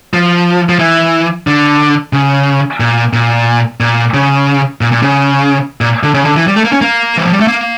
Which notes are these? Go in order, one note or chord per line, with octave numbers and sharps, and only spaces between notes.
F3
F3
E3
D3
C#3
A#2
A#2
A#2
C#3
A#2
A#2
C#3
A#2
D3
C#3
D3
E3
G3
A3
A#3
C#4
A#3
E3
F3
G3
A3
A#3